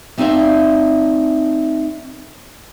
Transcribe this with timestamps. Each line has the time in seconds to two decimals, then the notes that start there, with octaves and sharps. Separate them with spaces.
0.18 A3 C4 D#4 D5 E5 F5